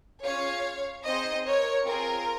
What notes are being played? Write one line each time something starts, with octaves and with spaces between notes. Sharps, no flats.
C#4 F4 G#4 C#5 F5
C4 D#4 G#4 C5 D#5
A#4 C#5
C4 F4 G#4 A#4